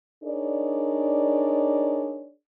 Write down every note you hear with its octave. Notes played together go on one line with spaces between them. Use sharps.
D4 D#4 G#4 A#4 C#5 D5